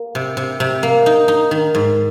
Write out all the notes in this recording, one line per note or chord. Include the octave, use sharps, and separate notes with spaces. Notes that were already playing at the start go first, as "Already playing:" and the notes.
Already playing: A#3
C3
C3
C3
A#3
D#4
D#4
D#3
G#2